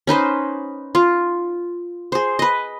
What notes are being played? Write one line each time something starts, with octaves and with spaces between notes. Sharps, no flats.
C#4 D#4 B4 C5
F4
G#4 C5
B4 D#5